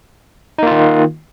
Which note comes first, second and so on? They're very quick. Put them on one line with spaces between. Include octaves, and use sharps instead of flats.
D#4 A#3 F4 D#3